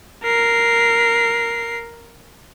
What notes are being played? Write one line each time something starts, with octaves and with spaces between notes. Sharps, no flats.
A#4 C7